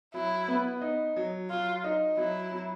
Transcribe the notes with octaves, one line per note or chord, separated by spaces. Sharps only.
F#3 E4
B3
D#4
F#3
F#3 F4
D#4
F#3 E4
F#3